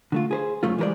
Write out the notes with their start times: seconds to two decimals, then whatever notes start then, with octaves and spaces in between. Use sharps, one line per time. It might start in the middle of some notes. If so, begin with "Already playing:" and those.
0.12 D3 A3 F4
0.31 G#4 B4 C5
0.63 F#2 C#3 A3 F4
0.78 E3 G3 G#3 A#4 C5 D5